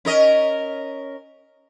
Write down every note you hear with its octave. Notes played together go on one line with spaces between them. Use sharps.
C#4 A#4 D#5